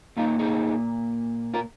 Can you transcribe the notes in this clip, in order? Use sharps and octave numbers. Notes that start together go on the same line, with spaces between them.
A#2 A#3 D#4 F4
D#4 G#4
F4 A#4